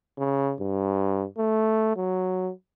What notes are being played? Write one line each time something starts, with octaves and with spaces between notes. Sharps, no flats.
C#3
G2
A3
F#3